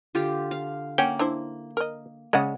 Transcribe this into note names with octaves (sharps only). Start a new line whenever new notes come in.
D3 F4 G4
F5
A#3 C#4 F#5 G5
D4 E4 C5
A#4 D#5
C#3 G#3 D5 D#5 F#5